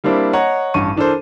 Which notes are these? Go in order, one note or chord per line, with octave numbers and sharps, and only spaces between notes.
G3 A#3 C4 D4 E4
C#5 D#5 F#5 A#5
A1 G2 A5 C#6 D#7
E3 D4 A4 A#4 C5